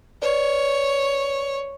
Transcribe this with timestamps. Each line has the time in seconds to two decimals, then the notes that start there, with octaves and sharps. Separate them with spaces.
0.22 B4 C#5 D5